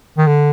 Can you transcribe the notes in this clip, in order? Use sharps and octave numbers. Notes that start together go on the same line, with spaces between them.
D#3
D3